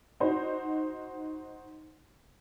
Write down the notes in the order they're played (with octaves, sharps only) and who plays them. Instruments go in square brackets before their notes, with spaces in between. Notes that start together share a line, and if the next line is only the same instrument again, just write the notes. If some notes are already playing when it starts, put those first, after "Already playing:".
[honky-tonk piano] D#4 F#4 C5